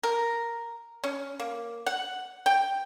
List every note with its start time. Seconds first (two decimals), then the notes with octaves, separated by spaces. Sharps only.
0.03 A#4
1.04 C#4
1.40 A#3
1.86 F#5
2.46 G5